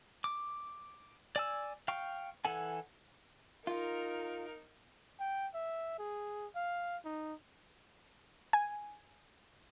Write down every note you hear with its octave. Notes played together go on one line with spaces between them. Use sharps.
D6
D5 G#5 E6
F5 G5 C#6
E3 A4 F#5 G#5
D#4 F4 A#4
G5
E5
G#4
F5
D#4
G#5